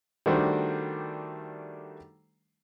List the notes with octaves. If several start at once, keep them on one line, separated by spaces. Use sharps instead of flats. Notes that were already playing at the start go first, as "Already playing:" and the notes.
D#3 G3 A3 D4 F#4 C5